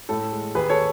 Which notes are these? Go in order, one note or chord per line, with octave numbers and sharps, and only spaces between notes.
A2 A4
G#3
D#2 G#4 B4
A4 C#5